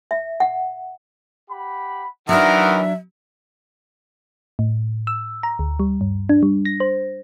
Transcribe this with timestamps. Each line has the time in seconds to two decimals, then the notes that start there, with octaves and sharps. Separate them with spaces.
0.11 E5
0.40 F#5
1.50 G4 F#5 B5
2.29 D#3 E3 F#3 D4 A#4 E5 F#5
4.59 A2
5.07 E6
5.43 A#5
5.59 D2
5.80 G3
6.01 G2
6.29 D4
6.43 G3
6.65 A#6
6.80 C5